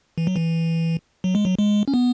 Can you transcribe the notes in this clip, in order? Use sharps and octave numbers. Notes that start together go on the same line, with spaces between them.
E3
F#3
E3
F#3
G#3
F#3
G#3
C#4
B3